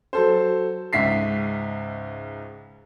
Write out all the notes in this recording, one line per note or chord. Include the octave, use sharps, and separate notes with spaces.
F#3 A4 C5
C#2 G#2 E5 B6 C7